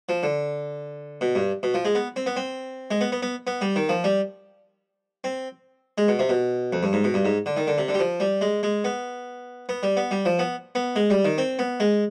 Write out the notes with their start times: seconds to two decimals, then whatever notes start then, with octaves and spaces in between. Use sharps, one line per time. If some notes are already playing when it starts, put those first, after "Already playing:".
0.09 F3
0.23 D3
1.21 B2
1.35 G2
1.63 B2
1.74 F3
1.85 G#3
1.95 B3
2.16 C4
2.26 B3
2.36 C4
2.91 G#3
3.01 B3
3.12 B3
3.22 B3
3.47 B3
3.61 G3
3.76 D#3
3.89 F3
4.04 G3
5.24 C4
5.98 G#3
6.08 B2
6.19 C3
6.29 B2
6.73 F2
6.83 G2
6.93 G#2
7.04 B2
7.14 G2
7.25 G#2
7.46 D3
7.57 D#3
7.67 D3
7.78 C3
7.88 D3
7.94 G3
8.00 F3
8.20 G3
8.41 G#3
8.63 G#3
8.84 B3
9.69 B3
9.83 G3
9.97 B3
10.11 G3
10.25 F3
10.39 B3
10.75 B3
10.96 G#3
11.10 G3
11.25 D#3
11.38 C4
11.59 B3
11.80 G#3